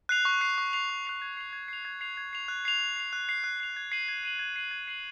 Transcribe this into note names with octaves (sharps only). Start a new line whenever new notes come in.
F#6 C7 F7
C#6
F#6 C7 F7
C#6
F#6 C7 F7
C#6
F#6 C7 F7
G#6
C7 F7
G#6
C7 F7
G#6
C7 F7
G#6
C7 F7
F#6
C7 F7
F#6
C7 F7
F#6
C7 F7
F#6
C7 F7
G#6
C7 D#7 F#7
G#6
C7 D#7 F#7
G#6
C7 D#7 F#7
G#6
C7 D#7 F#7